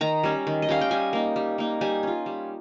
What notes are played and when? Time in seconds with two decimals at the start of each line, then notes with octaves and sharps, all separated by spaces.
0.01 D#3 A#5
0.23 G3 C#4
0.47 D#3
0.62 D#5
0.69 G3 C#4 F5
0.81 G5
0.91 G3 G#5
1.13 A#3 D#4
1.36 G3
1.58 A#3 D#4
1.81 G3 G#5
2.03 C#4 F4
2.26 G3